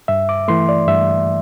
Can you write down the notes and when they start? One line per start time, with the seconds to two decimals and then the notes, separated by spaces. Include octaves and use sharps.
0.08 G2 E5
0.29 D6
0.48 E3 A3 C6
0.69 D5
0.88 G2 E5